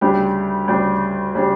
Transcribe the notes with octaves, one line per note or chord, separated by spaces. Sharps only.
D2 C#3 G3 D4 G4
D2 C#3 G3 D4 G4
C#3 G3 D4 G4